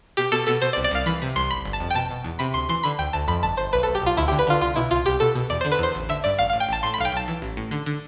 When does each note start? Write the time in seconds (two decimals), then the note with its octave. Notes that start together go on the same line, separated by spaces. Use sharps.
0.17 B2 G4
0.32 B2 A4
0.47 B2 A4
0.62 B2 C5
0.73 D5
0.77 C2
0.84 D5
0.91 C2 F5
1.06 E3 B5
1.22 C3
1.36 C2 C6
1.51 G1 B5
1.65 G1
1.73 A5
1.80 F2
1.90 G5
1.95 B2 A5
2.11 B2
2.24 E2
2.39 C3 B5
2.54 D2 C6
2.69 E3 C6
2.83 D3 B5
2.99 D2 G5
3.13 D2 A5
3.28 F2 B5
3.43 G1 A5
3.57 G1 C5
3.73 B1 B4
3.83 A4
3.88 B1
3.95 G4
4.02 B1 F4
4.17 D2 E4
4.28 G4
4.32 D3
4.39 B4
4.47 D3 F4
4.61 C2 F4
4.76 B2 E4
4.91 C2 F4
5.06 C2 G4
5.20 B2 A4
5.35 B2
5.50 E2 D5
5.61 C5
5.65 D3
5.72 B4
5.79 E2 C5
5.95 A1
6.09 D3 E5
6.24 G2 D5
6.39 A1 F5
6.50 F5
6.53 A2
6.60 G5
6.69 A1 A5
6.83 A2 C6
6.94 B5
6.98 B1 F5
7.05 G5
7.12 B1 A5
7.28 E3
7.42 A1
7.57 A2
7.71 D3
7.86 D3